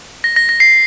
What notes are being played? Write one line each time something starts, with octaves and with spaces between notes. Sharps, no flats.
A#6
A#6
A#6
C7